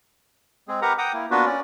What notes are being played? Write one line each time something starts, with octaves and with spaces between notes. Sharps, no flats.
G#3 C4 G#4
G4 A#4 B4 F#5 A#5
F#5 G5 A#5 D6 D#6
A#3 E4
A#3 B3 D4 F4 F#4 B4
C#4 D5